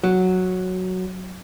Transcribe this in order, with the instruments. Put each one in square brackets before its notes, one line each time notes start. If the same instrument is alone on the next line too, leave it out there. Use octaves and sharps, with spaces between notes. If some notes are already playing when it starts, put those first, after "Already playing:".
[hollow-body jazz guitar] F#3